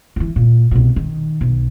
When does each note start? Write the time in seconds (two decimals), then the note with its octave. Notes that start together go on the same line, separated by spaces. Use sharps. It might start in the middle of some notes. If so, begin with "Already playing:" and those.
0.16 D#3 E3
0.36 A#2
0.71 C2 B2
0.96 D#3
1.41 B1